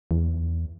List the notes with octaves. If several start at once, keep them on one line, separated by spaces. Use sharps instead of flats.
E2